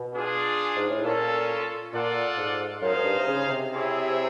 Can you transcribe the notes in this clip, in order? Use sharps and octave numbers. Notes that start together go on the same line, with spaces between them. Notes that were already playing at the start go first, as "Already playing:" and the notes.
Already playing: B2
D4 F4 G#4
G#2
A2
A#2 C#4 F4 A4
A#2 F4 A4 D5 F#5
G#2
F#2 D#4 G#4 C5 F5
G#2
G2
C3
C#3
C3
C4 E4 G#4 C#5 E5